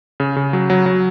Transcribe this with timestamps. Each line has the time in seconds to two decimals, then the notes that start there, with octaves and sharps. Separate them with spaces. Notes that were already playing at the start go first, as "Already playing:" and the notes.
0.20 C#3
0.36 C#3
0.53 F#3
0.70 F#3
0.86 F#3